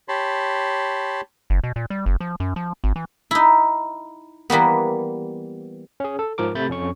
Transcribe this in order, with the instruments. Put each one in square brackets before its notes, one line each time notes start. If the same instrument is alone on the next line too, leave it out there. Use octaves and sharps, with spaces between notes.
[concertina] G4 C#5 A5 B5 C6
[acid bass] F#1
B2
A#2
G3
F#1
F3
F#2
F3
G#1
E3
[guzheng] D#4 E4
E3 G3 A#3 B3
[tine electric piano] C#4 G#4
A4
G#2 F3 A#4 D6
C3 A3 B5 G6 A6
F2 C#4 C#6